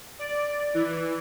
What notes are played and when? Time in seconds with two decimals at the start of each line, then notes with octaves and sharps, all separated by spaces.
0.19 D5
0.74 E3